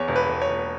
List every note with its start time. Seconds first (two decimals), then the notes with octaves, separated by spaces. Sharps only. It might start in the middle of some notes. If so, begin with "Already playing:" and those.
Already playing: E2 C#5
0.08 E1
0.16 B4
0.29 E1
0.42 C#5
0.49 E1